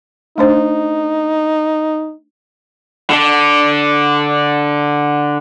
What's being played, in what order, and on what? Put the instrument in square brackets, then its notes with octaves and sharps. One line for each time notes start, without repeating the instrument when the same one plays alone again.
[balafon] A3 D4 C5 [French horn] D#4
[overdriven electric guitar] D3 D4